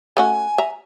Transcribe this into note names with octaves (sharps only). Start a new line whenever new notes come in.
A3 C#4 F#4 G#5
E5 A#5